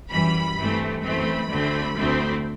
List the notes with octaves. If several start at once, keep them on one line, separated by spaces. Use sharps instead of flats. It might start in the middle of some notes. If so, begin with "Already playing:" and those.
F#2 E3 G3 B5
G2 E3 A3 C4
F#2 E3 A3 C4 B5
D2 D3 A3 C4
D2 D3 A3 C4